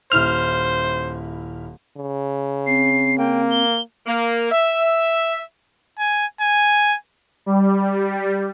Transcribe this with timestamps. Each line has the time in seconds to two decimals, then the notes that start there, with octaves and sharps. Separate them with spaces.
0.12 D#1 E4 C5 F6 F7
1.97 C#3
2.67 C4 C7
3.18 A#3 G5
3.51 G7
4.06 A#3
4.51 E5
5.99 G#5
6.41 G#5
7.46 G3